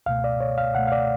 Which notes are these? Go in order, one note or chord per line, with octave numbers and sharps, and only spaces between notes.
C#2 B2 A3 F5
D5
C#5
F5
C#2 B2 A3 F#5
F5
D5